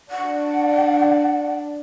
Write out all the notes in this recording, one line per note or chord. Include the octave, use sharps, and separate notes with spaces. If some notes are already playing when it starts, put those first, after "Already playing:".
D4 F#5